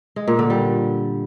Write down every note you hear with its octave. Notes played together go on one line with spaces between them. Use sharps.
G#3
A#2
D3
G3